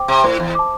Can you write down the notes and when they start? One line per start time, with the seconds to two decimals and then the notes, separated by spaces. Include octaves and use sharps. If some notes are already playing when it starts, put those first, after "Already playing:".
Already playing: C5 G5 D6
0.08 C3
0.24 A2 C5
0.40 E2
0.55 A5 D6